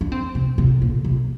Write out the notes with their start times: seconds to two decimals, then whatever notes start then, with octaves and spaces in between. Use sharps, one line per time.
0.01 D4
0.12 C4
0.35 C3
0.58 C3
0.82 A#2
1.04 C3